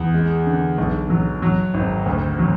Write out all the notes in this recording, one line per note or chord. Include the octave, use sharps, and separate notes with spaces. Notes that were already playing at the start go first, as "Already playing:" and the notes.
Already playing: E2
G#3
D3
B1
F#3
F#3
G#1
D2
F#3